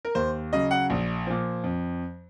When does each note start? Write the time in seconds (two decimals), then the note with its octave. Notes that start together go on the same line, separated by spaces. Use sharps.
0.05 A#4
0.15 D#2 C5
0.52 C#3 F#3 D#5
0.71 F#5
0.90 A#1
1.27 A#2 F3
1.64 F2